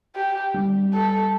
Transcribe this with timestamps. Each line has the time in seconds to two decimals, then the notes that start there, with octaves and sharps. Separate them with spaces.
0.16 G4
0.54 G3
0.94 A4